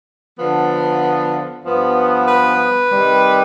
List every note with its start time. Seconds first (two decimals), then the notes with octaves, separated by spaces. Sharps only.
0.37 D3 F3 B3
1.64 G2 F3 B3
2.26 B4
2.90 C3 D#3 G3